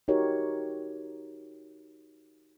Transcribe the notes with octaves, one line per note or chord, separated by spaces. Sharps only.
D#4 F#4 G4 A#4 C#5